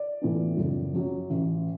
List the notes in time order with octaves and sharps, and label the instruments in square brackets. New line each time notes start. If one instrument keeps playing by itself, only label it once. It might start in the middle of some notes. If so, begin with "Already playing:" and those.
Already playing: [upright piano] D5
A2 E3 B3 D4
F#1
F#2 F#3
A1